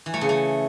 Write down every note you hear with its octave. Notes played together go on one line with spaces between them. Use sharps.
E3
A3
C#3
A3